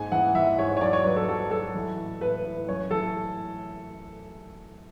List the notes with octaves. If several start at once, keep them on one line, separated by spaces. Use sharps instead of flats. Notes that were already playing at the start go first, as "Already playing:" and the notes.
Already playing: G#2 G#5
E3 F#5
E3 E5
G#2 C#5
C#5
F#3 D5
C#5
F#3 B4
A4
F#3 A4
F#3 A4
E3
A2
A2 B4
A2
F#2 C#5
E3 A4